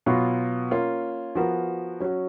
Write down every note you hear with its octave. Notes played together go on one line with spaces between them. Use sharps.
B2 F#3 B3 F4
A#3 C#4 F4
F3 B3 F#4 A#4
F#3 C#4 F#4